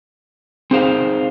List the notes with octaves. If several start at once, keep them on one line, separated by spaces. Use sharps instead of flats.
C4 D#4 G#4 C5 F5